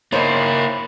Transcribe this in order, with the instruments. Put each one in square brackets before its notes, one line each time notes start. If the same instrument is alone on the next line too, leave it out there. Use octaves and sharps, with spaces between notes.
[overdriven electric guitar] A#3 E4 [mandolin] D#4 C5 C#5